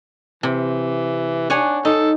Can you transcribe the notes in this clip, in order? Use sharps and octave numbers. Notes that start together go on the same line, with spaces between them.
C3 E3
D4 C#5 F#5 G#5
D#4 A4